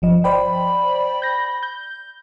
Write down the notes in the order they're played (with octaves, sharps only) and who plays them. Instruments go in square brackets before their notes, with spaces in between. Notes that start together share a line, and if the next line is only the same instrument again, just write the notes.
[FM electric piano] G1 F3 D#5
[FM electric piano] C5 D5 G5 [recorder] B5
[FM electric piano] G6 A#6
G6